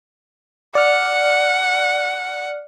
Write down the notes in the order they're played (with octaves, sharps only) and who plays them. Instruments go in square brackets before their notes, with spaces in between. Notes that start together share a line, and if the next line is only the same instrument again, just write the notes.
[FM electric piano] D5 F6 [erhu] F#5